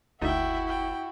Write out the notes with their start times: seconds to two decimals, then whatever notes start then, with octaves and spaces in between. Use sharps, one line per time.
0.21 F#1 D2 D#4 E4 F#4 A4 E5 G5
0.68 G5